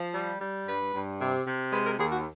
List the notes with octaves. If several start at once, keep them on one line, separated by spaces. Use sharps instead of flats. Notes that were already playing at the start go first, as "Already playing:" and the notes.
Already playing: F3
G3
G3
G2 B4
G2
C3
C3
G#3 B4
A#4
D#2 G#4
F#4